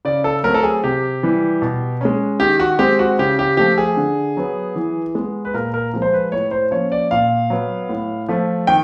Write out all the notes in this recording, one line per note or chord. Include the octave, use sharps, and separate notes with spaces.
C#3 D5
A4
F#3 A3 C4 A#4
A4
G#4
C3 G4
E3 G3
B2
G#3 C#4
D#3 G4
F#4
G#3 C4 G4
F#4
C#3 G4
G4
F3 A3 G4
G#4
D3
F#3 B3
E3
G#3 B3
B4
A#2 A#4
A#4
F3 G#3
C5
B4
A2 C#5
C5
F3 A#3 C#4 C#5
D5
A#2 F5
F#3 B3
A2
F3 A3
D#3 G5